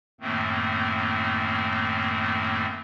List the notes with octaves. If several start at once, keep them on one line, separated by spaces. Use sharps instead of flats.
F#2 A2 D#3 A3 A#3 C4